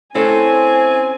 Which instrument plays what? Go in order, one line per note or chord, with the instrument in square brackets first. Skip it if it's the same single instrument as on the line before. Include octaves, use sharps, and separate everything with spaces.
[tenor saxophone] C4 [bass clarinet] C#4 [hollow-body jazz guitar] E4 A4 C#5 [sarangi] G#5